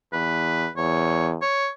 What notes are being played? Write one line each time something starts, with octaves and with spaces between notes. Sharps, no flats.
E2 B4
E2 C#5
C#5